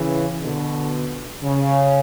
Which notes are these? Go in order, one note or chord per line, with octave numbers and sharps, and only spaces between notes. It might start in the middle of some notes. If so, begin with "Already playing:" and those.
Already playing: C#3 E3
B2 D3
C#3